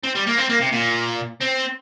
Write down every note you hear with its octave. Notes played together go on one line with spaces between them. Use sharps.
C4
G3
A#3
C4
A#3
C3
A#2
C4